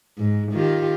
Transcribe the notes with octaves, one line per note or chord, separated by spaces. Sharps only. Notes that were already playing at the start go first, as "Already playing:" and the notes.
G#2
D#3 F4 G4